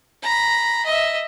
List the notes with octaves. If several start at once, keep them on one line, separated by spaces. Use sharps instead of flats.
A#5 B5
D#5 E5